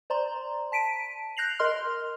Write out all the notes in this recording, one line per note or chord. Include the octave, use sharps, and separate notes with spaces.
C5 D5 A#5 C6
A5 B6 D7 D#7
F#6 G6 A#6 C7 F7 F#7
A#4 D#5 C6 F6